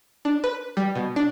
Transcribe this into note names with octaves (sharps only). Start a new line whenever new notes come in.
D4
B4
G3
B2
D4